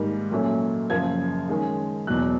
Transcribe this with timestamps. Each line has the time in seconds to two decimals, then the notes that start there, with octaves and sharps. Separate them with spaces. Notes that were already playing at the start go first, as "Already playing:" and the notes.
Already playing: G#2 D#3 G3 A#3
0.31 A#2 F#3 A3 C#4
0.90 F#2 C#3 F3 A#3 G#6
1.49 D#3 G#3 C#4
2.07 E2 B2 F#3 F#6